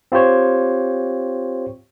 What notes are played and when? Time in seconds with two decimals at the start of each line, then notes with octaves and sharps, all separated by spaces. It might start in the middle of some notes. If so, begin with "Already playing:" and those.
0.12 C4 F4 G4 C5 C#5